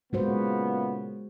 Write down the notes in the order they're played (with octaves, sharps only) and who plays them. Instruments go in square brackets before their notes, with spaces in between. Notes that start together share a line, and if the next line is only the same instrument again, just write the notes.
[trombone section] A#2 C#3 B3 [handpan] G#3 F#4 C5